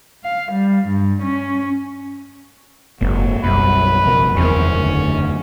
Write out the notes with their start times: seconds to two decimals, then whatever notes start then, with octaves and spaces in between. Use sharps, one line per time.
0.24 F5
0.52 G3
0.88 G2
1.22 C#4
3.01 F#1 G#2 F#3 A#3 C4
3.44 B1 F#2 G3 B4
4.04 F#1 C2 F2 B2 A#4
4.37 E2 D#3 C4 C#4 A#4
4.73 F#1 D2 D3 A3